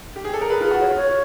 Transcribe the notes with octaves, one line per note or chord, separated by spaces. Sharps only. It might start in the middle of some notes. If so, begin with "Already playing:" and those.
G4
G#4
A4
A#4
G#4 B4
F4
G#4
F#4
C#5
F4
C#5